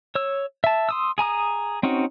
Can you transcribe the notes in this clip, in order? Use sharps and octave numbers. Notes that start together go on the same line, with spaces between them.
C#5 E6
E5 A5
C6 D#6 E6
G#4 G#5 A#5 D#6
C4 C#4 D#4 F#4